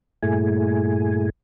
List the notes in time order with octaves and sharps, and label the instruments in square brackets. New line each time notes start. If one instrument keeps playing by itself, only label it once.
[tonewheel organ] G2 A#2 A3 E4 G#4 G#5